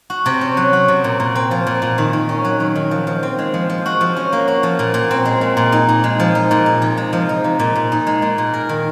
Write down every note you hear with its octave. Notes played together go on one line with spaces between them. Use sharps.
F#4
C3
C#4
F#3
F#4
C3
A#2
A#2
C4
F3
A#2
A#2
D#3
D#3
C#4
F#3
D#3
D#3
F3
F3
C4
G#3
F3
F3
F#4
F3
C#4
A#3
F#4
F3
A#2
A#2
C4
G#3
A#2
A#2
D#4
A#2
G#3
F3
D#4
A#2
D#4
C3
G#3
F3
D#4
C3
A#2
A#2
D#4
G#3
A#2
A#2
A#4
D#3